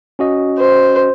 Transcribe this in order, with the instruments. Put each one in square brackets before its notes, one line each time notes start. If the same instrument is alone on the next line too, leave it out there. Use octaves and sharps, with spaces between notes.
[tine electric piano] C#4 F#4 D#5
[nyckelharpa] C5